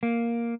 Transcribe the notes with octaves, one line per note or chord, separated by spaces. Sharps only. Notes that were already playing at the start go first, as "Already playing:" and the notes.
A#3